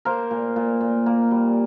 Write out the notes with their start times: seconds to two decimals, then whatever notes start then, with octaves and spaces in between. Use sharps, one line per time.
0.05 A#3 A#4 C5
0.31 A#2
0.56 A#2
0.81 A#2
1.06 A#3
1.31 G3